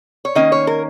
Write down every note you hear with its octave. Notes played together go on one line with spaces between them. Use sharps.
C#5
D#3 A#3 C#4 D#5
C#5
A#4